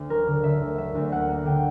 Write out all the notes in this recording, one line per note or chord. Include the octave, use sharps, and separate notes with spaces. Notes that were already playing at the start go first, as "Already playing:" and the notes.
Already playing: D2
F#3 A#4
D3
D3 E5
D2
F#3 E5
D2
A#3 F#5
A#3
D3 G5